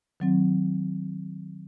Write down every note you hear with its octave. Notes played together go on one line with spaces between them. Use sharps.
D#3 F#3 C4